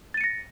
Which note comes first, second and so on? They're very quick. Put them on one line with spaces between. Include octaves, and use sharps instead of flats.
A6 D#7 C#7 A#6